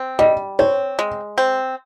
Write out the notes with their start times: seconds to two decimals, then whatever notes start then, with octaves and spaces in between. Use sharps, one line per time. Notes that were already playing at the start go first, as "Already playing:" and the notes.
Already playing: C4
0.19 G3 D#5
0.59 C4 C#5
0.99 G#3
1.38 C4